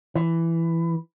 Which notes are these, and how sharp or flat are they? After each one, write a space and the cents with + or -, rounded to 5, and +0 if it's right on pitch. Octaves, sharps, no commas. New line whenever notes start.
E3 +10